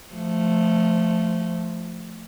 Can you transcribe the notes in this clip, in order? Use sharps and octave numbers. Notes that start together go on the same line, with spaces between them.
F3 A3